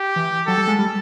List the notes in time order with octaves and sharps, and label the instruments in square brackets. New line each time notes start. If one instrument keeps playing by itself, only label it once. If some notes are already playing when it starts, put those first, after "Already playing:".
Already playing: [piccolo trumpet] G4
[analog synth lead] E3
[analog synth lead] F#3 [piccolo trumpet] A4
[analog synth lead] G3
G#3
G3